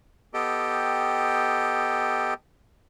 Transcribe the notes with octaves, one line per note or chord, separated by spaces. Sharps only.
B3 G4 A4 D#5 G5